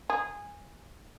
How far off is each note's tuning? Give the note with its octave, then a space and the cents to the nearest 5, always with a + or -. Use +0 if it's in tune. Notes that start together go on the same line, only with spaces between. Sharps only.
G#4 -15